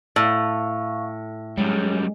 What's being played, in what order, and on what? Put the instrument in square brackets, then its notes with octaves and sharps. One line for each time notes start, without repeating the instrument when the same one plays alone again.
[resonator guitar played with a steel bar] A2 [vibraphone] F5 C#6
[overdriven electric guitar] F#2 G3 [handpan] G#3 [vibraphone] C#5